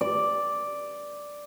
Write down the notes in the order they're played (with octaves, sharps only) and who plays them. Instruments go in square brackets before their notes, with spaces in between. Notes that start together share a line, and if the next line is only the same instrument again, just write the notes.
[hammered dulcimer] D5